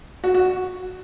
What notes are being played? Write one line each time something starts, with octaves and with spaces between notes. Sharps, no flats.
F#4
F#4